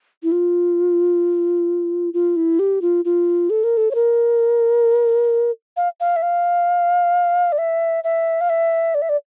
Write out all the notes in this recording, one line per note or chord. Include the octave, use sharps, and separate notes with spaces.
E4
F4
F4
E4
G4
F4
F4
A4
A#4
A4
C#5
A#4
F5
F5
E5
F5
D5
E5
E5
F5
E5
D5
E5
D5